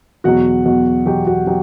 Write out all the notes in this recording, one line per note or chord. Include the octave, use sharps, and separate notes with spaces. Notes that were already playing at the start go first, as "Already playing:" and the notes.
E2 B2 F#3 F#4 F#5
E2 B2 F#3
E2 B2 F#3 G4 G5
F#4 F#5
B2 F#3 G4 G5